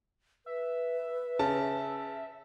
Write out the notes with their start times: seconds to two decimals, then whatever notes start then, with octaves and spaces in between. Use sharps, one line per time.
0.46 B4 E5
1.39 C#3 A5